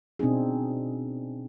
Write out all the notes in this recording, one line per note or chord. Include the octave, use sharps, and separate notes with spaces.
B2 C4 D4 D#4 G#4